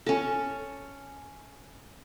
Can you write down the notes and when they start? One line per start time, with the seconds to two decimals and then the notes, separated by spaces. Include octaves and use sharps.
0.06 C#4 A4